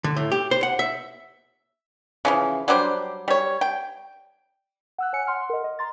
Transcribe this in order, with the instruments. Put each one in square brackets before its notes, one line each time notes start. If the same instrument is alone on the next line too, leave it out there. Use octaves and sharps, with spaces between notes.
[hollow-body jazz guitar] D3
A2
G4
C5
F#5
E5
[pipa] C#3 E3 F3
F#3 G3 D4 C5
G3 C#5
G5
[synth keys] F#5 E6 F#6
C#5 F#5 G#5 F#6 C#7
F#5 C6 F6
A#4 D#5
D#5
A#5 C6 A6